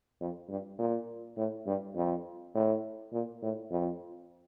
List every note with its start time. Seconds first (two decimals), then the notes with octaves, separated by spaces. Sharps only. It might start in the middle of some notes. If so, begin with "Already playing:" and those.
0.20 F2
0.49 G2
0.79 A#2
1.37 A2
1.66 G2
1.96 F2
2.55 A2
3.13 A#2
3.42 A2
3.71 F2